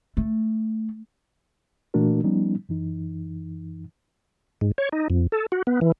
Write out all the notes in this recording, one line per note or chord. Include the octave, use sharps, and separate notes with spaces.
A3
A#2 E3 A3 D4 F#4 A#4
F3 G3 B3 C#4 D#4
F#2 E3 D#4
G#2
C#5
D#4
F2
A4
F#4
B3
E3